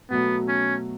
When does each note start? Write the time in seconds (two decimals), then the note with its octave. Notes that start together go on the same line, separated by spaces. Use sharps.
0.10 B2 F#3 A3 B3
0.48 C#4